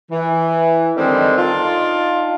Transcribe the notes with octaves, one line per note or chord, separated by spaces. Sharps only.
E3
D3 D#3 G3 G#3 C4
D4 D#4 F4